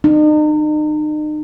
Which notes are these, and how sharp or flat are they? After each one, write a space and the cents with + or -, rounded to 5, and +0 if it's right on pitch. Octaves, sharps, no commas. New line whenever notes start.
D#4 -40